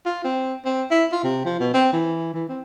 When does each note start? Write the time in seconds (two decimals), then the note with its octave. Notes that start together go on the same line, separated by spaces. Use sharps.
0.06 F4
0.24 C4
0.65 C4
0.91 E4
1.12 F4
1.23 C3
1.45 F3
1.60 B2
1.74 C4
1.93 E3
2.34 E3
2.49 C4